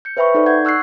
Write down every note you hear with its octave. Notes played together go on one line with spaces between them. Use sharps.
G6 C#7
B4 C5 E5 G5 B5 C#6
D#4 A4 D5
F#5 G6 G#6
C#6 E6 F#6 G#6 C7